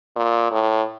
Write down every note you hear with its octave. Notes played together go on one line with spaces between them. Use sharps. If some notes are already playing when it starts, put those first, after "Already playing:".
A#2
A2